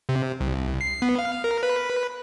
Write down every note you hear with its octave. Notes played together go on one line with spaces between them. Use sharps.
C3
C2
C7
B3
F5
A#4
B4